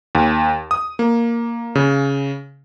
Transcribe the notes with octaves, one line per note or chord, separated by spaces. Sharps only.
D#2
D#6
A#3
C#3